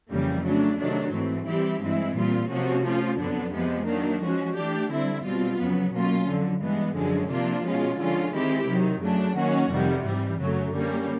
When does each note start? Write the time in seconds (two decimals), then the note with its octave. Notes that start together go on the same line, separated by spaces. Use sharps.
0.10 F2 C#3 E3 G3 A#3
0.43 C#3 F#3 A3 D4
0.78 C3 D#3 F#3 A3 D4
1.12 G#2 E3 A3 C4
1.47 E3 G3 C4 E4 G4
1.81 G2 E3 G#3 C4 E4
2.15 A#2 G3 C4 F4
2.50 C3 F3 A#3 C#4 F#4
2.84 F3 A3 C#4 F4
3.18 F2 D3 F#3 B3 D4
3.53 C3 F3 G#3 B3
3.87 D#3 F#3 A#3 D4
4.21 F3 G#3 C#4 F#4
4.56 E3 A3 D4 G4
4.90 D3 G3 C4 E4
5.24 B2 G3 C4 F4
5.58 F2 C#3 F#3 B3
5.93 B2 F#3 A#3 C#4 F4
6.28 F2 D3 F#3
6.62 G2 E3 G#3 B3
6.96 F#2 D3 F3 G#3 C#4
7.30 C3 F3 A#3 D4 F4
7.65 B2 G#3 C#4 F4
7.99 D3 F3 G#3 C#4 F4
8.34 D#3 G#3 C4 E4 G4
8.68 C3 D#3 F#3
9.01 F#2 C#3 F#3 A3 D4
9.36 D#3 F#3 A#3 C#4 F#4
9.70 F2 C3 D#3 G3
10.04 G#2 E3 G3
10.39 F#2 C#3 F#3 A3
10.73 D3 G3 A#3 C#4